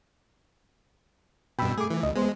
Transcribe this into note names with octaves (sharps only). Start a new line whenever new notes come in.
G2 B2 G5 B5 E6
A3 G#4 D6
E3
D2 D#5
G#3 B3 C5